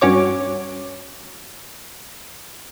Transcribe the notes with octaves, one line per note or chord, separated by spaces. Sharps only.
G2 C#4 F#4 C#5 D6